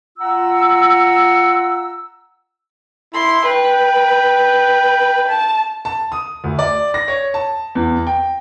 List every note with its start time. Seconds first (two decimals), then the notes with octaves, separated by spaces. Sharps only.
0.19 F4 F#5 A#5 E6
3.14 E4 C6
3.45 B4 G5
5.27 A5
5.85 A5
6.12 D#6
6.44 D2
6.59 D5
6.94 A#6
7.08 C#5
7.34 A5
7.75 E2
8.07 G5